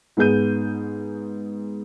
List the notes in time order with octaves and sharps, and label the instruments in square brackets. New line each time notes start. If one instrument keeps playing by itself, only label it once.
[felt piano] G#2 B3 G#4 G6 D#7